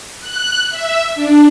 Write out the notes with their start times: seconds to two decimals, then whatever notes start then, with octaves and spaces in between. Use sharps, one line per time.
0.20 F#6
0.70 E5
1.15 D4